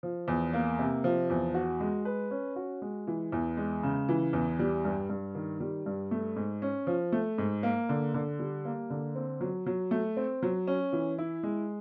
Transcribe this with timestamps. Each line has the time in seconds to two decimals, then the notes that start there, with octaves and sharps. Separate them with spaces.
0.03 F3
0.28 E2
0.53 A#3
0.79 C3
1.04 F3
1.30 E2
1.54 F#4
1.80 G#3
2.05 B4
2.31 C#4
2.56 F#4
2.82 G#3
3.07 E3
3.32 E2
3.57 G#3
3.83 C#3
4.09 E3
4.33 E2
4.59 G3
4.85 G2
5.10 G2
5.35 D#3
5.60 G3
5.86 G2
6.11 A3
6.36 G#2
6.62 C#4
6.87 F3
7.12 A3
7.38 G#2
7.63 A#3
7.89 D3
8.14 D3
8.39 G3
8.65 A#3
8.90 D3
9.15 C4
9.41 F#3
9.66 F#3
9.91 A3
10.17 C4
10.43 F#3
10.67 C#4
10.93 E3
11.18 E4
11.43 G#3